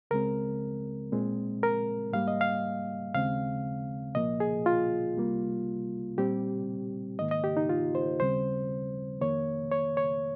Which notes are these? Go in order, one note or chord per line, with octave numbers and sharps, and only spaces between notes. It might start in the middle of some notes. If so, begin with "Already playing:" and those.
C#2 C#3 G#3 C4 A#4
A#2 G#3 C4
A#4
G#2 G3 A#3 F5
D#5
F5
D#2 C#3 G#3 C4 F5
C2 A#2 F3 A#3 D#5
G#4
F4
C2 C3 G3 A#3
A#2 G3 C4 G4
G#2 D#3 A#3 D#5
D#5
G4
D#4
F4
C5
D#2 C#3 G3 C4 C5
F2 D#3 A#3 C#5
C#5
C#5